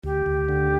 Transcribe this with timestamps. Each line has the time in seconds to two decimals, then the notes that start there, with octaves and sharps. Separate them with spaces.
0.04 D2 G4
0.26 D2
0.49 D3